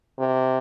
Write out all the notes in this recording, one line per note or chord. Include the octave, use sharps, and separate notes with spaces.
C3